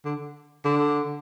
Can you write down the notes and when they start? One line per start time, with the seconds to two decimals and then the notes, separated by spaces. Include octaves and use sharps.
0.05 D3
0.65 D3